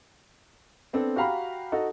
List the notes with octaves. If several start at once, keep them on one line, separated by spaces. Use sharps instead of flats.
B3 C4 D4 A4
F#4 G4 F5 A#5 B5
D#4 F#4 A4